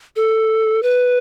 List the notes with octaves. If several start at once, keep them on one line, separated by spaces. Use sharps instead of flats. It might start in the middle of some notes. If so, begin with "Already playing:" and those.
A4
B4